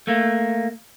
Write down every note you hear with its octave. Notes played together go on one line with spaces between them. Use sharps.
A3 A#3